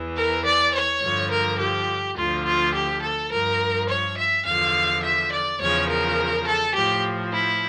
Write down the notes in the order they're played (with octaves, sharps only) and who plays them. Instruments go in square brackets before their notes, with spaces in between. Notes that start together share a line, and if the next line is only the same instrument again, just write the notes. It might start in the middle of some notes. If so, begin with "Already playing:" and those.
Already playing: [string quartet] E2 E3
A#4
D5
C#5
G2 D3 F3
A#4
G4
D2 D3 F3 F4
F4
G4
A4
G2 F3 A#4
C#5
E5
E2 D3 F3 F5
E5
D5
E2 C#3 F3 C#5
A#4
A4
A2 F3 G4
E4